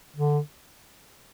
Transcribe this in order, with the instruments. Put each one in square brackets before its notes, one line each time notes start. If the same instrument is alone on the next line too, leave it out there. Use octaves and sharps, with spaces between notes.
[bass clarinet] D3